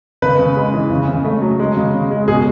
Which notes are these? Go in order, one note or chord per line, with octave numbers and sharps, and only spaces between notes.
C#3 B4
C#3
G#3
E3
C#3
C#3
A3
F#3
G#3
C#3
C#3
G#3
B2 G#4